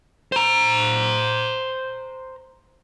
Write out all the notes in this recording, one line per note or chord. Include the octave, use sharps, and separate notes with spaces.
C5 A#5